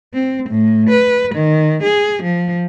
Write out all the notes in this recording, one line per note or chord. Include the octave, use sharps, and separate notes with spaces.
C4
A2
B4
D#3
G#4
F3